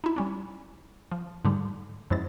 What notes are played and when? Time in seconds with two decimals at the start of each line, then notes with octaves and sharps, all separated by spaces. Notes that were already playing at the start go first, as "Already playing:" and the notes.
0.04 D#4 E4
0.16 G3 C#4 D4
1.12 F3
1.45 G#2 D3 G3
2.10 F#2 F3 G#3 E4 A6